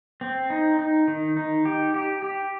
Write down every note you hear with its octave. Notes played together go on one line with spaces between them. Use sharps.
C4
D#4
D#4
D#3
D#4
G4
G4
G4